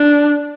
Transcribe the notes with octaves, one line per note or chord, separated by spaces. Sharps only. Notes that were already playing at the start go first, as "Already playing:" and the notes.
Already playing: D4